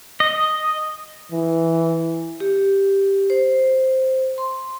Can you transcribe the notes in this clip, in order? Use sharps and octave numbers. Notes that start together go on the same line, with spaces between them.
D#5
E3
G4
C5
C6